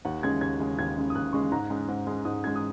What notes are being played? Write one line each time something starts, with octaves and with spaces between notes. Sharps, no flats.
D#2 F#5
C#3 G#3 C#4 G#6
D#2 G#6
C#3 G#3 C#4
D#2 G#6
C#3 G#3 C#4
D#6
D#2 F#6
C#3 G#3 C#4 C#6
G#2 A#5
G#3 C#4
G#2
G#3 C#4
G#2 D#6
G#3 C#4 G#6
D#6